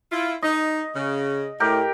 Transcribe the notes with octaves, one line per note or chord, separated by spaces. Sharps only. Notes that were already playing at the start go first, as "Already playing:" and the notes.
E4 F4
D#4 D#5
C#3
A2 G4 A#4 G5